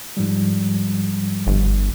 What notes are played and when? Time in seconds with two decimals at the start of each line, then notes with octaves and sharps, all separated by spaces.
0.17 G#2 F3 G3
1.47 G1